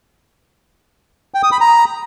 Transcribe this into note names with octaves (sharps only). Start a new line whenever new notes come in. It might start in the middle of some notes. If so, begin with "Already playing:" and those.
G5
D#6
B5
A#5